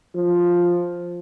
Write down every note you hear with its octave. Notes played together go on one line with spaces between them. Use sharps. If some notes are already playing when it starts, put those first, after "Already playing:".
F3